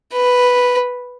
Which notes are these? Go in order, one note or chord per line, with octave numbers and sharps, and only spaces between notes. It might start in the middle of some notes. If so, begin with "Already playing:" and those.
B4